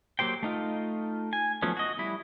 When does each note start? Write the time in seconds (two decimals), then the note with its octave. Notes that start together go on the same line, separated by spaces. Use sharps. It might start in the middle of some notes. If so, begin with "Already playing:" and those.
0.19 F#3 A#3 G4 C5 G5
0.43 A3 D#4 F4
1.33 G#5
1.62 F3 F#3 A3 B3 C#4
1.77 F#4 D#5
1.98 G3 E4